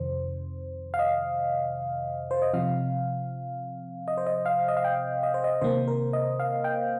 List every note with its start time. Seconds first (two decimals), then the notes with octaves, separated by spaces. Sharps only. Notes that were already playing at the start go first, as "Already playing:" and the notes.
Already playing: F2 C3 D#3 C5
0.94 F5
0.99 D#5
2.31 C5
2.42 D#5
2.54 C3 F3 C4 F5
4.08 D#5
4.17 C5
4.27 D#5
4.46 F5
4.68 D#5
4.77 F5
4.84 G5
5.23 D#5
5.34 C5
5.44 D#5
5.61 C3 D#3 A#3 C5
5.88 A#4
6.13 D#5
6.40 F5
6.64 G5